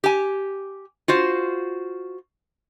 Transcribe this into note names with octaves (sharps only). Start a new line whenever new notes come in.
G4 G#5
F4 F#4 C5